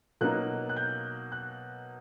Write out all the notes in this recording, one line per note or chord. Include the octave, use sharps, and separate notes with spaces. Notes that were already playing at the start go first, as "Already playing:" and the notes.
B2 F#3 A#3 D#4 F#6
F#6
G6
F#6